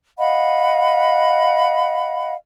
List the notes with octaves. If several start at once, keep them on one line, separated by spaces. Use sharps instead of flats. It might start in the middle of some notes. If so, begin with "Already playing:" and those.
D#5 F5 F#5 B5